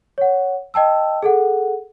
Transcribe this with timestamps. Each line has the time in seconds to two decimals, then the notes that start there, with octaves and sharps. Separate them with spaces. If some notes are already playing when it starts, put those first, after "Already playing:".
0.18 C#5 F#5
0.74 D#5 G5 A5 E6
1.23 G#4 A4 F#5